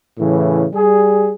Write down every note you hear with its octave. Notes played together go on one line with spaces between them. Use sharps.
A2 C#3 E3
G3 G#4